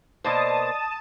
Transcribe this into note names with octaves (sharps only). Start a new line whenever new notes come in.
B2 A#3 C5 D5 D#5 A5 D#6